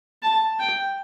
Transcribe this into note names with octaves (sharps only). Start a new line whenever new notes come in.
A5
G5